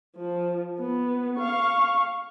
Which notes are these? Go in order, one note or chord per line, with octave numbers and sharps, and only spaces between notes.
F3
B3
F5 C#6